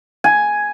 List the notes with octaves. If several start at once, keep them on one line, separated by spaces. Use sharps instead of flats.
G#5